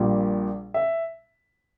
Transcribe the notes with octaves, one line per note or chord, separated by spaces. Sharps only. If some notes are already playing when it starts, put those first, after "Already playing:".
Already playing: A#1 A#2 G3
E5